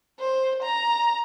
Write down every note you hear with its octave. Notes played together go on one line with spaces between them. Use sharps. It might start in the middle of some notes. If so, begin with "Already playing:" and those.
C5
A#5